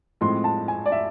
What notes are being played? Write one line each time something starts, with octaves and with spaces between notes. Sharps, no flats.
A2 F3 G#3 C4 C6
A5
G#5
D5
E5